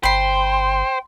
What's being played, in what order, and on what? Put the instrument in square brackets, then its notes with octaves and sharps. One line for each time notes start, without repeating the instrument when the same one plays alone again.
[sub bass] G1 [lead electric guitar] C5 [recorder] G5 [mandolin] B5 C6